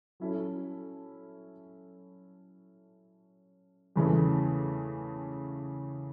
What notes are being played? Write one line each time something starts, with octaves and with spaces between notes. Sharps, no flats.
F#3 C#4 E4 A4
E2 C#3 E3 A3